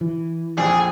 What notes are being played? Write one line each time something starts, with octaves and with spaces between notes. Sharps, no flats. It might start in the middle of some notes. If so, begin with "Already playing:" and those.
E3
A#1 F2 A#2 G#4